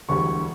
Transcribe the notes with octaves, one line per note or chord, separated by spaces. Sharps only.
E1 D2 D3 G3 C#6